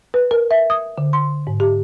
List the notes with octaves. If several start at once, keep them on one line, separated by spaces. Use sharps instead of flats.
B4
A#4
E5
D#6
D3
C6
G#2
G4